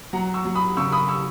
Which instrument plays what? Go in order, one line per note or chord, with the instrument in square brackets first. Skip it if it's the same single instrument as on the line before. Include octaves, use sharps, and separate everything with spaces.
[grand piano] F#3 [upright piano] F#5 A#5
[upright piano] C#6 E6
[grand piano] F#3
[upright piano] B5 D#6
[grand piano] C#3 [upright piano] C#6 E6
[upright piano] B5 D#6
C#6 E6